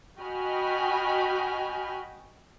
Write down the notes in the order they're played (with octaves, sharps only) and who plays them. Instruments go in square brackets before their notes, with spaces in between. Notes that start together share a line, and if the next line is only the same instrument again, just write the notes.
[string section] F#4 D#5 G5 G#5 B5 F6